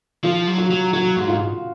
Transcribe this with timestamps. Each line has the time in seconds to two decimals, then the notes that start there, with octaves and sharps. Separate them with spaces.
0.23 F3 F4
0.47 F#3
0.58 F#4
0.71 F#3
0.93 F#3 F#4
1.17 G#2
1.28 F4